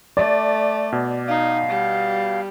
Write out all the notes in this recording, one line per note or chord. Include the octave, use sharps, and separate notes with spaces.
A3 D5
B2
D#4 F5
G3